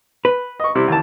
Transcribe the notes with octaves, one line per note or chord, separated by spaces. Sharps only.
B4
D#5 C#6
C3 G3 E4
D#2 E3 A5